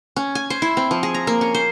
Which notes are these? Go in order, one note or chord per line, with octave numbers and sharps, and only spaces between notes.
C#4
G#5
C5
E4
C4
F3
G#4
A#5
A#3
C#4
C5